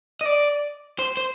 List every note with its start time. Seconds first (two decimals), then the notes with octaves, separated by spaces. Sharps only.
0.21 D#5
0.26 D5
0.99 C5
1.17 C5